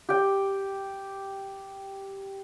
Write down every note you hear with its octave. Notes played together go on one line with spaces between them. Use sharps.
G4 G5